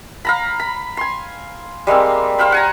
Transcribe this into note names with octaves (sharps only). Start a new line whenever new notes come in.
F5 A#5 B5
B5
G#5 C6
G3 G#3 A#3 C4
C5 F5 G5 B5
F#5 G#5 A#5